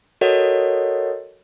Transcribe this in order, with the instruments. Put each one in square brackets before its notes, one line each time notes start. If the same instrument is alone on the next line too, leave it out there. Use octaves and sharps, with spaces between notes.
[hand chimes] F#4 A4 A#4 C#5 D#5 F#5